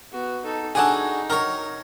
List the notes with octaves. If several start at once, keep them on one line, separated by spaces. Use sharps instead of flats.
B3 F#4
D#4 A4
D4 D#4 F#4 G#4 A4 D5 G#5
D#3 F#3 A#4 C#5